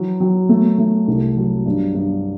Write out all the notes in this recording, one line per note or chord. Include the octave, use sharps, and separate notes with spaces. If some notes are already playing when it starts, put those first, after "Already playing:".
Already playing: E3 F#3
F#3
A3
A3
C2
F#3
G2
G2